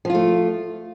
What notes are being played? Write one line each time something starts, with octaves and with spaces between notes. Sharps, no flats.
F3 A3 F4